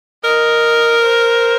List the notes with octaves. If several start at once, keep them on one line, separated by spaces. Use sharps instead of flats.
A#4 D#5
C5